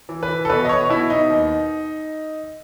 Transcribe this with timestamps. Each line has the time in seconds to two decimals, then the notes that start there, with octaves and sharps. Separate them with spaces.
0.09 E3
0.23 B4
0.29 E3
0.45 A4
0.50 B2 B4
0.65 D#5
0.69 B2 C#5
0.89 B2 E4
1.10 B2 D#4
1.30 D#2